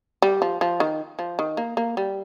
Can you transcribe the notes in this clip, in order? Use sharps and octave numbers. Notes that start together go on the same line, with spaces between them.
G3
F3
F3
D#3
F3
D#3
A#3
A#3
G3